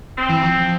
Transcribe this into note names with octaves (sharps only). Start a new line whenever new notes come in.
C4
E3
F3